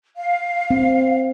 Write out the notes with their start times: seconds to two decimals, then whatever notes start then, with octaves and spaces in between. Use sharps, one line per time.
0.17 F5
0.71 C4